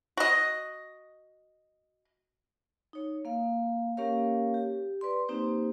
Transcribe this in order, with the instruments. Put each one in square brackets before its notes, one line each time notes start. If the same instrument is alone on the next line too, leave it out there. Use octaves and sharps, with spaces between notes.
[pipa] F#4 D#5
[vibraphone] D#4 C#5
A#3 F5
A#3 C#4 G4 A#4 C#5 F5
G4
B4 D5 C6
A#3 C4 D#4 G4 C5